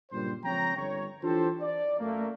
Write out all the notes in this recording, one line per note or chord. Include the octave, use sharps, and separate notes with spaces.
F#1 G2 A#2 G3 C5
C#2 F3 C4 C#5 G5 A#5
G1 C#5
E3 D4 F4 G4 A4 C5
D5
F#2 A3 A#3